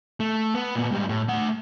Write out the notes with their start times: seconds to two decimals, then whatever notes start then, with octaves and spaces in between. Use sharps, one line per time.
0.20 A3
0.54 B3
0.76 A#2 B3
0.91 G#2 G3
1.09 A2
1.28 A3 F#5